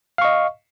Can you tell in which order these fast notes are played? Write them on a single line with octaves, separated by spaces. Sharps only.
F5 C#6 D#5